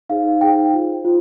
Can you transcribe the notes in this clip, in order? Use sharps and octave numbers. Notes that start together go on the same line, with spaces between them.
D#4 G#4 C5 F5
D#4 G#4 C5 G5
F4 C5
F4 C5